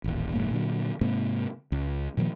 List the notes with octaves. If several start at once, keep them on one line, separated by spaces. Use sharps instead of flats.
D#1 A1
F1 G#2 A#3
A#2 D3 F#3
G#2 C3 A#3
C#2
A#2 D#3 F3 A#3